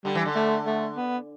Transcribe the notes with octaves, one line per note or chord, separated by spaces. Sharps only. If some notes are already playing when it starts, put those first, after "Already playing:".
D3 G3
E3
D3
A3
A3
B3